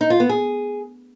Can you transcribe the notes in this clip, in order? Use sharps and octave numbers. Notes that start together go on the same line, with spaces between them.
D#4
F4
B3
G#4